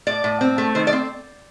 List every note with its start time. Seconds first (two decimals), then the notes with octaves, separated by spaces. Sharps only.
0.07 A2 D5
0.24 A2
0.41 C4
0.58 A3
0.75 D#3 C5
0.87 D5
0.93 C4